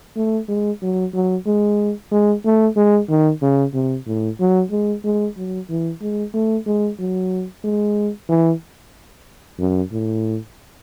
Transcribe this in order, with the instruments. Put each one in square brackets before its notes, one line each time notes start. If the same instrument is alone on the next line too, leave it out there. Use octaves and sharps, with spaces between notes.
[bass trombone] A3
G#3
F#3
F#3
G#3
G#3
A3
G#3
D#3
C#3
C3
A2
F#3
G#3
G#3
F#3
E3
G#3
A3
G#3
F#3
G#3
E3
F#2
A2